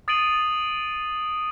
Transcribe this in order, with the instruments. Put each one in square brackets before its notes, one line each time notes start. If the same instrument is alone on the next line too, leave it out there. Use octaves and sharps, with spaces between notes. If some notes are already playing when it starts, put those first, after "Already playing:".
[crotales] D#6 A6 C7 D7 D#7 F#7